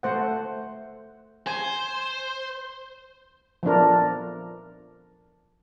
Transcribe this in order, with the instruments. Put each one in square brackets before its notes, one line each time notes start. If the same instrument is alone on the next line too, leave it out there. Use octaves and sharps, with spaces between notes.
[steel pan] A3 C5 F#5
[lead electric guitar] C5 [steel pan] G#5
[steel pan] F3 B3 D4 A#4